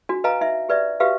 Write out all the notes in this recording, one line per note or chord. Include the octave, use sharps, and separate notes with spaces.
D4 F#4
B4 D#5 F5 G#5 A#5
D#4 E5
G4 B4 D5 E5
F#4 G4 B4 E5 F5